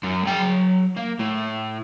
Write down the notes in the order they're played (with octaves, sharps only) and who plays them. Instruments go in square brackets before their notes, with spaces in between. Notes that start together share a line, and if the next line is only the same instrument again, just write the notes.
[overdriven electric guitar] F#2
F#3 G5
A#3
A2